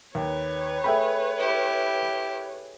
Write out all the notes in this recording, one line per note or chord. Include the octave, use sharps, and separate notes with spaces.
D#2 B4 C#5
A3 G#4 E5 G5 B5
E4 G4